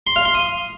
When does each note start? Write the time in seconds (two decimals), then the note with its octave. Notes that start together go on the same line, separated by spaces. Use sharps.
0.07 C6
0.16 F5
0.25 C6
0.35 D#6